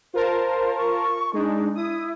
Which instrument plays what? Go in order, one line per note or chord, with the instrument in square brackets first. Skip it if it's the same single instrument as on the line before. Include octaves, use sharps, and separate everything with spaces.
[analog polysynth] F4 A#4 A5 [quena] C5
[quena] C#6
[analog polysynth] G#3 D4 [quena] D#4
[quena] E4 [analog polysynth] D#6